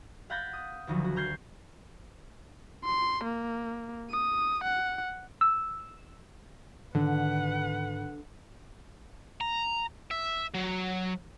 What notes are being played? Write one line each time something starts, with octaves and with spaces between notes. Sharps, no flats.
F5 F#5 B5 G6 A6 A#6
D#6
D#1 D2 F3 F#3
F#4
A#5 F6 G6 G#6 C7
C6
A#3
D#6
F#5
E6
G#2 D3 D#3 D4 B4 F#5
A#5
E5
F#3